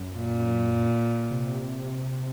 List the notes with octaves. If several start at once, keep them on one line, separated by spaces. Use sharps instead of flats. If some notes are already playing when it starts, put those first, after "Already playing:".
Already playing: F#2
A#2
C3